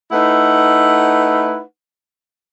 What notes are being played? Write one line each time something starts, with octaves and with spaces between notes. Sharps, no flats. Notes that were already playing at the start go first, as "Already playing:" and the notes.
A3 D#4 E4 B4 F#5